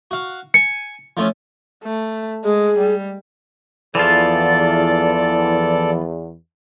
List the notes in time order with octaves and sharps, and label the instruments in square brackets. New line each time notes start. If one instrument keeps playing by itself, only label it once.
[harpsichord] F#4 F5
[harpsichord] G#5 [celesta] C#7
[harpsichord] F3 A3 C#4
[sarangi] A3
[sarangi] G#3 [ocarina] G#4
[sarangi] G3
[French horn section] E2 [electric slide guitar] E3 F3 F4 [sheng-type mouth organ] A4 D5